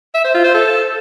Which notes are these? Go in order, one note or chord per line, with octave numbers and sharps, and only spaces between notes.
E5
C5
F4
C5
A4